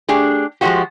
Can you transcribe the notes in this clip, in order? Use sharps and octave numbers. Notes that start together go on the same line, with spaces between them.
A3 D4 G4 G#4
F3 G#3 C#4 D#4 F#4 G4